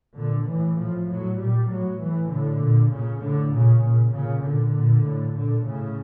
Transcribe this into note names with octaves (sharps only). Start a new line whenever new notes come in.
A#2 D3
A2 E3
A2 F3
A2 F#3
A#2 G3
A2 F#3
A2 E3
A2 D3
A#2
A#2 C#3
A2 D3
A#2 C#3
A#2
A#2 C#3
A#2 D3
A#2
A2
A#2 D3
A2 C#3